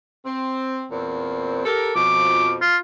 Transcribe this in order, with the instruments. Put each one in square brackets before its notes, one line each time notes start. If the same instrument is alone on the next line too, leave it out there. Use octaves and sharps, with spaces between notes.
[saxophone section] C4
E2 A#2 C4
G4 A4 A#4
[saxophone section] F2 B2 F3 [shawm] D6
[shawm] F4